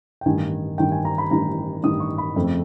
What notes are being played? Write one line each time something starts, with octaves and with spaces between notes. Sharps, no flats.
G5
A1 G2 D#3 G#5
A1 G2 D#3 G5
G#5
A#5
B5
A1 G2 D#3 A#5
A1 G2 D#3 D#6
C#6
B5
F2 C#3 F3 A3 C4